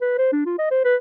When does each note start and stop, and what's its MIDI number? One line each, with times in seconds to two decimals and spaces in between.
0.01 0.16 71
0.18 0.30 72
0.32 0.45 62
0.46 0.58 65
0.58 0.66 75
0.71 0.84 72
0.85 0.96 71